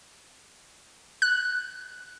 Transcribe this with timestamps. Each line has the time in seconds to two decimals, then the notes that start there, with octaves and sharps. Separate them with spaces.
1.22 F#6